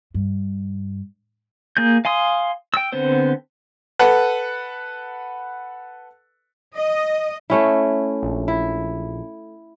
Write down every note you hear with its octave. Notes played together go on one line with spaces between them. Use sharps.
G2
A#3 G#4 G6
F5 G#5 C6 D#6
G5 E6
D3 B3 C4 C5
A4 B4 F#5
D#5
A3 C#4 E4
A#1
E4